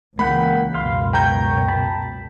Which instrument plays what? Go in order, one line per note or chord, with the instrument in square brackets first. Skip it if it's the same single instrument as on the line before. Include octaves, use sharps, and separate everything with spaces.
[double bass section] C#2 C#3 E3 [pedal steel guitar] A#3 F#5 G5 [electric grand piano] B5
[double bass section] C#2 F#2 B2 [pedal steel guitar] F5 C6
[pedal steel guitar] C#5 B5 [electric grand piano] G5 A#5 G6
[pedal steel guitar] A5 B5